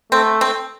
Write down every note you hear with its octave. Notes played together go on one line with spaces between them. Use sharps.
A3 C4
C4